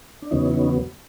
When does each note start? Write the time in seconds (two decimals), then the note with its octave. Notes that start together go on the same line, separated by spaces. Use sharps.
0.22 D4
0.31 E2 C#3 F#3 B3 C#4 D#4
0.49 E4
0.54 C#4 D#4